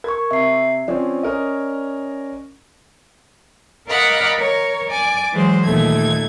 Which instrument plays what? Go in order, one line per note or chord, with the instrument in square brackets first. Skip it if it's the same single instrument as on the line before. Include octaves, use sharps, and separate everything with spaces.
[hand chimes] A#4 C#6 [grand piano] G#6
[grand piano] C3 [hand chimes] E5 C7
[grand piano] F3 C4 C#4 [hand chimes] D5
[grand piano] C#4 A#4 D#5
[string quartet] A#4 D5 D#5 F5 F#5 B5
A#4 C#5
D5 G#5 D6
E3 F#3 G#3 C5
D#2 A#2 A3 G#6